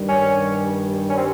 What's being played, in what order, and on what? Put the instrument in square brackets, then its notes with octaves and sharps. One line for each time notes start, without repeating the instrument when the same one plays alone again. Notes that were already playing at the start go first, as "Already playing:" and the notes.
Already playing: [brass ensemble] G2 D#3 G3
[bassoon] C#4
C#4
C4